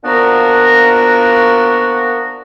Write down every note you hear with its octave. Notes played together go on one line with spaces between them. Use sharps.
A#2 F3 B3 D4 F#4 A#4